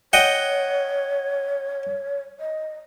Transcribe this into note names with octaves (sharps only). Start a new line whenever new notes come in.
C#5 D#5 F#5 G5
D#5